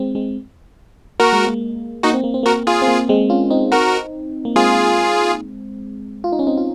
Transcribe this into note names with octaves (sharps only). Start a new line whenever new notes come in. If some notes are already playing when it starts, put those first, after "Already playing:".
Already playing: G#3 C4
G#3 C4
A#3 F#4 A#4
G#3
A#3
A#3 D#4 F#4
C4
A#3
C4
A#3 F#4 A#4
F4 G#4
C4
A#3
G#3 C4
C#4 F4
C4 D#4
F#4 A#4
A#3
G#3 C4 F4 G#4
F4
D#4
C#4
C4 D#4
F4